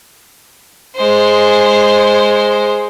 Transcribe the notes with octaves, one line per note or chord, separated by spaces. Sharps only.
G#3 C5